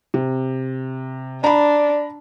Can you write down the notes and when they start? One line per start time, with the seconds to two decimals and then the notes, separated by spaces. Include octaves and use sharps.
0.14 C3
1.44 D4 D5 A#5 B5